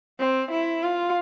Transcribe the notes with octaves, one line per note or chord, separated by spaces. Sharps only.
C4
E4
F4